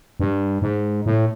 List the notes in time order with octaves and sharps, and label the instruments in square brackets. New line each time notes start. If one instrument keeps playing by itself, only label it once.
[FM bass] G2
G#2
A2